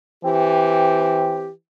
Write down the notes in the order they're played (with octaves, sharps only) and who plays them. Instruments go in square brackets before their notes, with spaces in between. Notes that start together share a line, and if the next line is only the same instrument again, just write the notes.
[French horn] E3 [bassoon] C4 [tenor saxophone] G4